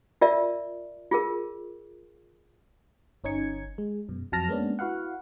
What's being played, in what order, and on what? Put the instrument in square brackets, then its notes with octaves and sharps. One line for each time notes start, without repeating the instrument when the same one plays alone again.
[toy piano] F4 A#4 D5 E5
F4 G#4 A#4
[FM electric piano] G1 C#4 D#4 G#6 C#7
G#3
F#2 B2
F2 F#3 A5 F6 A#6
G#3 A#3 B3 C#4 D4
E4 F#4 B4 F5 F#5